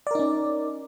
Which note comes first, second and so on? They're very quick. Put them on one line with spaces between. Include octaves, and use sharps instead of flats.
D5 A#4 D#4 C#4